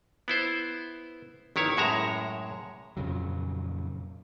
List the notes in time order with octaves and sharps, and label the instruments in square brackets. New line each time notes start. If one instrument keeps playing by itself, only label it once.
[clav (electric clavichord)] B3 E4 C5
G1 D#3 E4 C#5
F#2 A2 G#3 C#5 E5 A#5
[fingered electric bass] F2 A#2 C#3 F#3